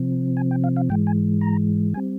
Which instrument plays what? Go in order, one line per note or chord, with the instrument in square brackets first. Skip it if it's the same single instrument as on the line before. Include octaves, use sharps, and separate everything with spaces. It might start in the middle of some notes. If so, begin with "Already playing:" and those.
Already playing: [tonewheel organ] C3 F3 C4
G#5
G5
F5
F5
G#2 E3 G#3 G5
G#5
A#5
G3 C4 G#5